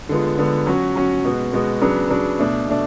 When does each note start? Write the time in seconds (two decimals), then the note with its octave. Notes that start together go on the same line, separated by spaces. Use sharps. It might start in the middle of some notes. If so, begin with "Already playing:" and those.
0.09 D3 G#3 B3 F4
0.38 D3 G#3 B3 F4
0.66 F#3 C#4 F#4
0.95 F#3 C#4 F#4
1.25 B2 G#3 B3 F#4
1.53 B2 G#3 B3 F#4
1.81 C#3 F#3 B3 D4
2.10 C#3 F#3 B3 D4
2.39 B2 A3 D4
2.67 B2 A3 D4